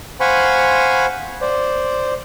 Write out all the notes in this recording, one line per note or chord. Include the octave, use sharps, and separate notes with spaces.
C5 F5 F#5 G#5 B5 C#6
C5 D5